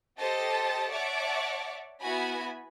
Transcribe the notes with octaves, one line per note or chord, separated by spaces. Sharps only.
G4 A4 C5 D#5 A5
C#5 D5 E5 F#5 A5 D6
B3 E4 F#4 G#5 B5